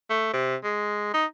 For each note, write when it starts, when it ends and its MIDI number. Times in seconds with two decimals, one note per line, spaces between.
0.10 0.29 57
0.33 0.55 48
0.63 1.10 56
1.14 1.25 63